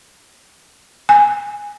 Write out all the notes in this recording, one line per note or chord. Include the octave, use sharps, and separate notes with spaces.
G#5